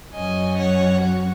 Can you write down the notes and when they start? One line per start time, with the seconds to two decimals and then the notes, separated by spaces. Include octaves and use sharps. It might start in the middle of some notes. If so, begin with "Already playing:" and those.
0.15 F#2 F#3 C#4 D#5 G#5
0.58 C#5 F#5
1.00 F#4